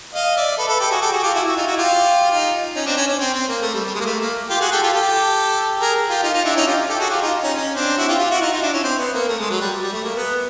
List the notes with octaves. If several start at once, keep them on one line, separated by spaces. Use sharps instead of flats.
D#5 F5
D5 E5
A4 B4
A4 B4
G4 A4
F#4 G#4
G4 A4
F#4 G#4
F4 G4
E4 F#4
E4 F#4
D#4 F4
E4 F#4
F4 G4
D#4 F4
C#4 D#4
C4 D4
C#4
C#4
C4
C4
A#3
A3
G3
G3
G#3
A#3
A3
A#3
F4 G4
F#4 G#4
G4 A4
F4 G4
G4 A4
G#4 A#4
F4 G4
D#4 F4
D#4 F4
D4 E4
C#4 D#4
F4 G4
G4 A4
F#4 G#4
F4 G4
D#4 F4
C#4 D#4
C#4
C4 D4
E4 F#4
F4 G4
F4 G4
E4 F#4
D#4 F4
D#4 F4
D4 E4
C#4
C4
B3
A#3
A3
G#3
F#3
G3
G3
A3
A#3
B3